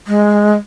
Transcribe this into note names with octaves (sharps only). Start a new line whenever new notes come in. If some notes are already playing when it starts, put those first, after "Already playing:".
G#3